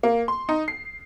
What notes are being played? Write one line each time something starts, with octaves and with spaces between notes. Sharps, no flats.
A#3
C6
D#4
C7